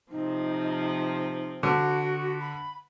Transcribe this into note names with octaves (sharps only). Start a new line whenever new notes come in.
C3 F3 C4 D#4
D3 F#4
B5